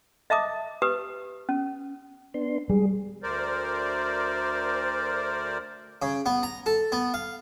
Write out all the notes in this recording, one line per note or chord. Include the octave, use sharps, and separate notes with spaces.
D#5 E5 A5 D6 D#6
G4 B4 D#6
C#4
B3 D4 C6
G3 G#3 G#4
D2 A#4 C5 D5
C#3
B3
A#5
A4
B3
F5